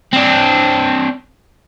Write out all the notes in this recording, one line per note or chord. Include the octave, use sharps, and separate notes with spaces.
C4 D4